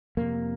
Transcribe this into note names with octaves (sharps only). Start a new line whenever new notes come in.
F2 C3 A#3